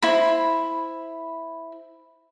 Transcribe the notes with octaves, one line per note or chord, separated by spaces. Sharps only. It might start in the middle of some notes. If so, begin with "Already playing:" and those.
E4 C5 B5